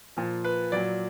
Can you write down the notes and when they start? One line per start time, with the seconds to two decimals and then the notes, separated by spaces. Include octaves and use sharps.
0.17 A#2 F3
0.44 B4
0.72 A#2 F#3 D5